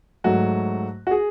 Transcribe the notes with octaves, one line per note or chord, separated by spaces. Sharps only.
G#2 F#3 A3 F#4
F#4
G#4